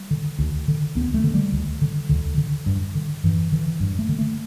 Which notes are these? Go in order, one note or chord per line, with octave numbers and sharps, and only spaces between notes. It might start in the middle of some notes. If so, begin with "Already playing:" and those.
Already playing: G3
D3
D2
D3
D2 B3
A3
D3
G3
D2
D3
D2 D3
D3
G2
D3
G2 E3
D3 E3
G2
A3
D3
A3